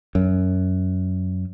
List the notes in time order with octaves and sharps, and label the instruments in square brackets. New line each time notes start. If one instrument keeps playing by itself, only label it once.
[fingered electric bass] F#2